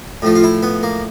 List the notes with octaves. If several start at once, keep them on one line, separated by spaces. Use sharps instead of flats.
A2 F3 A3
F4
E4
B3
A#3